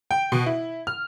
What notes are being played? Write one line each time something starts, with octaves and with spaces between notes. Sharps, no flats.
G5
B2
E4
F6